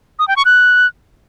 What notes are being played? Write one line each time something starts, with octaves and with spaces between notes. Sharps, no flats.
D#6
G5
C#6
F#6